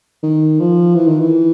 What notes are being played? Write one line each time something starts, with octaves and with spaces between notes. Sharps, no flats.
D#3
F3
E3
D#3
E3